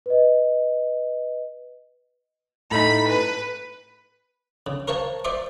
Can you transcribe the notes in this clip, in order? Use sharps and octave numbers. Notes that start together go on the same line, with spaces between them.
B4 D#5
A2 A3 D#4 B5
B4
C#3
A#4 C5 C#5 F5 A5
C5 D5 E5 C6 D6